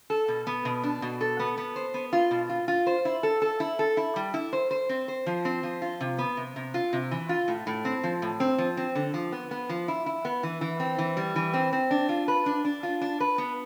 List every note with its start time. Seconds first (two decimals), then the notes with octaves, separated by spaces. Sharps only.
0.10 A4
0.28 B2
0.47 B3
0.65 B2
0.84 D4
1.02 B2
1.21 A4
1.39 B3
1.57 B3
1.76 C5
1.94 B3
2.13 F4
2.31 B2
2.49 F4
2.68 F4
2.87 C5
3.05 E4
3.23 A4
3.42 A4
3.60 E4
3.79 A4
3.97 E4
4.16 G3
4.34 E4
4.53 C5
4.71 C5
4.89 C4
5.08 C5
5.26 F3
5.45 C4
5.63 F3
5.82 F4
6.01 C3
6.18 B3
6.37 C3
6.56 C3
6.74 F4
6.93 C3
7.11 E3
7.29 F4
7.48 A2
7.67 A2
7.85 C4
8.03 F3
8.22 A2
8.40 C4
8.58 F3
8.77 C4
8.95 D3
9.14 F3
9.32 B3
9.51 B3
9.69 F3
9.88 E4
10.06 E4
10.25 B3
10.43 E3
10.61 E3
10.80 C4
10.98 E3
11.17 G3
11.36 E3
11.53 C4
11.73 C4
11.91 D4
12.09 F4
12.28 B4
12.46 D4
12.65 D4
12.83 F4
13.01 D4
13.20 B4
13.38 B3